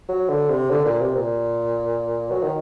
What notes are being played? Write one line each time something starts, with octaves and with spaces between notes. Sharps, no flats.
F#3
D3
C3
D3
A#2
C3
A#2
F#3
D#3